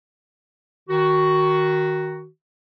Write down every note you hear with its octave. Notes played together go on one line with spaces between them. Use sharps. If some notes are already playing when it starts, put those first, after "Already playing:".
D#3 F#4